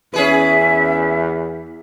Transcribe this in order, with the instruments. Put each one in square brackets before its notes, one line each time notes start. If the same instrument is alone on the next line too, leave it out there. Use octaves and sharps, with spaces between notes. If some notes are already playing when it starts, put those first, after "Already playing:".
[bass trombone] E2 [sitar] C#4 G#4 B4 [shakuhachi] E5